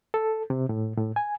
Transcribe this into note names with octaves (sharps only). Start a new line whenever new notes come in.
A4
C3
A2
A2
G#5